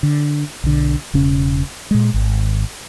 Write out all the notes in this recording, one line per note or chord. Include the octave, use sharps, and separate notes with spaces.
D3
B1 D3
E1 C#3 C#4
A#2 G#3
G#1